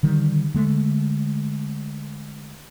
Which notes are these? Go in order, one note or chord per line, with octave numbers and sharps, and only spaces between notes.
D3 D#3 G3
D3 G#3 A3